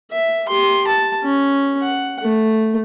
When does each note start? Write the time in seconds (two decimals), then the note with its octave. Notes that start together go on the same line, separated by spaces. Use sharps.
0.12 E5
0.48 G4 C6
0.87 A5
1.24 C#4
1.82 F#5
2.23 A3